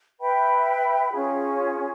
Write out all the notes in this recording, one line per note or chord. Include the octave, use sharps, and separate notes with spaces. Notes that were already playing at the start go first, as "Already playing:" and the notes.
B4 E5 G5 B5
C#4 F4 G#4